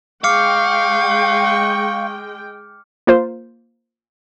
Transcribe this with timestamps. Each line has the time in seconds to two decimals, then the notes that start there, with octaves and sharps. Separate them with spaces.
0.24 G#3 F5 G5 C#6 D6 F6 C#7
3.07 A#3 F4 C5